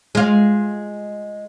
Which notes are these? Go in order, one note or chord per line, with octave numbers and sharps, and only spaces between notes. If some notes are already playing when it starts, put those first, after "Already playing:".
G#3 F4